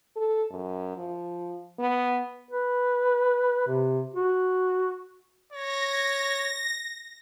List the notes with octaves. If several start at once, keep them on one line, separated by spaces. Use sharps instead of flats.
A4
F#2
F3
B3
B4
C3
F#4
C#5 A#6